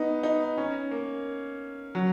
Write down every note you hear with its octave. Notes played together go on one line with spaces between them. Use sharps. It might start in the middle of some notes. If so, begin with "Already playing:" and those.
Already playing: B3 D#4
D#4
C#4
A#3
F#3